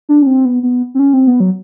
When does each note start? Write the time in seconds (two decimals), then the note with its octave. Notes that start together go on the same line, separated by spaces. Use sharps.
0.09 D4
0.22 C#4
0.26 C4
0.45 B3
0.63 B3
0.95 C4
0.99 C#4
1.13 C4
1.27 B3
1.40 F#3